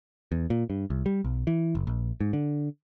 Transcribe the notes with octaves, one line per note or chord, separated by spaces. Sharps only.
E2
A#2
G2
C2
G3
B1
E3
F#1
A#1
G#2
D3